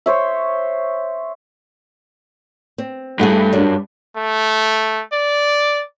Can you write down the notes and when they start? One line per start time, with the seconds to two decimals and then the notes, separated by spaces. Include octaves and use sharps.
0.06 C5 C#5 E5
2.78 C4
3.19 G2 A3 E4 F#4 G#4
3.53 F#2 D4
4.16 A3
5.12 D5